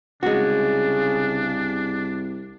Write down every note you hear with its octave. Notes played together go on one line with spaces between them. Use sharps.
C2 C#3 G#3 D4 F#4